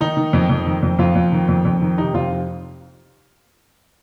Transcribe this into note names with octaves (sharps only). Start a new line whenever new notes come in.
D#3 D#4
D#3
F2
F2
D#3
F2
F2 F4
F2
D#3
F2
F2
D#3
C3 D#4
F2 F4